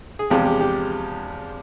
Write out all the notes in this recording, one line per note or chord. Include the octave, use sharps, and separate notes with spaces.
G#4
E2 C3 F3 G#3 G4
G4
G4